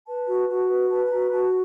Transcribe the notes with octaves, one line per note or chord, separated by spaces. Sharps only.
B4 A5
F#4
F#4
B4
B4 A5
A5
F#4 A#5
F#4 A5